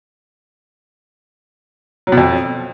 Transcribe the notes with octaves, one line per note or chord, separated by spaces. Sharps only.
F#3
B2
F2